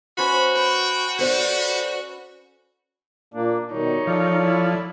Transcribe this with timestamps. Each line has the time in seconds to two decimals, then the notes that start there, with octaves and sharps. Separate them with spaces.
0.18 C#4 F#4 B4 C5 B5
0.55 B4 G5
1.19 G4 A4 C5 D5
3.34 A#2 A#3 D4
3.72 B2 D#3 G3 D#4 C#5
4.07 F3 A4 D5
4.42 E4